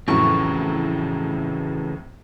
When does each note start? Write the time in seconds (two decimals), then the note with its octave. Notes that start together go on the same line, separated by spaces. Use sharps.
0.08 F2 A2 C#3 E3 F#3 C#4 C#6